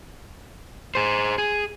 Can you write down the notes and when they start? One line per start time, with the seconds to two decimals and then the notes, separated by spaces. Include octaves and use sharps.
0.95 G#4 C5
1.38 G#4